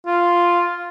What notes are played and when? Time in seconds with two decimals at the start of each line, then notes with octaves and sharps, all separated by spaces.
0.06 F4